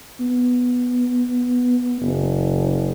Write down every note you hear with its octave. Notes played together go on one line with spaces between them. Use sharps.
B3
F#1